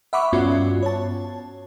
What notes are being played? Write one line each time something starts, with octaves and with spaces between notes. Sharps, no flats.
E5 F#5 B5 C#6 D6
G2 B3 C#4 F4 F#4
C#5 A5